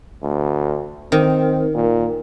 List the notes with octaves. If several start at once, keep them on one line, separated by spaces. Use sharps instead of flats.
D2
D#3 C4
A#2